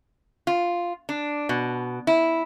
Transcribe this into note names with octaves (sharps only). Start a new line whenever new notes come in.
F4
D4
B2
E4